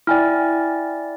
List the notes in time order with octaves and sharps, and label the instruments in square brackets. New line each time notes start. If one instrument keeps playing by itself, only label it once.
[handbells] E4 D5 [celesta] G5 G#5 F6